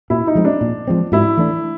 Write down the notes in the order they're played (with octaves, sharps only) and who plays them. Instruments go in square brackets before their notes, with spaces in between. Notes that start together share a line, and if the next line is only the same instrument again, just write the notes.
[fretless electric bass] A#2 [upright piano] E4
[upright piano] D#4
[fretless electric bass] F3 G#3 C4
[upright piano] D4
[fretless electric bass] A#2
F3 G#3 C4
[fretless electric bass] G#2 [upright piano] E4
[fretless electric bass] E3 A3 D4